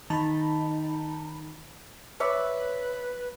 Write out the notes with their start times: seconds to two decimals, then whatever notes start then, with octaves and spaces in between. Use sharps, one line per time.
0.10 D#3 D#4 A5 B5
2.20 B4 C#5 D5 E5